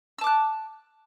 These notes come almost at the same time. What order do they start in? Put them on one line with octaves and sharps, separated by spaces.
E6 A5 D6 F#6